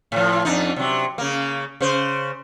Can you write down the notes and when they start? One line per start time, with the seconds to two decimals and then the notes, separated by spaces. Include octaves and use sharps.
0.12 A2 F3
0.45 F2 D4 D#4
0.76 C3 F#3
1.18 C#3 A#3
1.81 C#3 C5